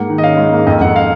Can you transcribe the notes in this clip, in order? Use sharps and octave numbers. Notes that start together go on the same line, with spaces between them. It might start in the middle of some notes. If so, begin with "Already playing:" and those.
Already playing: G#2 A#3 F#5
D#3
D#5
C#4 F5
G#2
A#3
F2 D#5
F2 F#5
F5